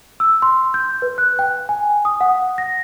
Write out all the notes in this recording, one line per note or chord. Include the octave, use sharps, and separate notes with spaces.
E6
C6
G6
B4
F#6
G5
G#5
D#6
F#5
A#6